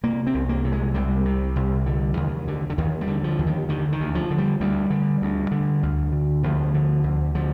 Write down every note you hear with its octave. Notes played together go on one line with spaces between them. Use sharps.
C3 A#3
C4
C2
A#3
C3
G#3
C2 G3
C3
C2
D3
D#2
D3
D3
D#2 D#3
G3
D3
F3
D#2
D#3
D3 D#3
D#3
D2
F3
D3
G3
D2 G3
D3
D2
D3
D2
D3
D2 F3
D3
D2
D3 F3